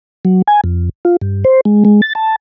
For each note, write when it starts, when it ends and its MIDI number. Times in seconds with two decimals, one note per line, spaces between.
0.25 0.42 54
0.48 0.61 80
0.64 0.89 41
1.05 1.16 65
1.22 1.44 43
1.45 1.61 72
1.65 1.84 56
1.85 2.01 56
2.02 2.13 93
2.15 2.36 81